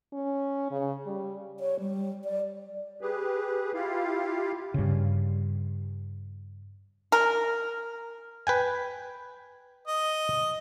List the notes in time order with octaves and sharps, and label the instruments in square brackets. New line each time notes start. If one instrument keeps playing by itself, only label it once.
[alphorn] C#4
C#3
G3
[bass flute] C#5
G3
D5
[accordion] G4 G#4 B4
E4 F4 G4 F5
[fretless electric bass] G2 C#3
[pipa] A#4
[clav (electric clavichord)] B4 G5 G#5
[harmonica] D#5